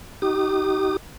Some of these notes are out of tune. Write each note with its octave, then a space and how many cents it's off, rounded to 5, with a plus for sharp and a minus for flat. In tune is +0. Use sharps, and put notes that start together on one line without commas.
D#4 +15 G4 -35 D#6 -40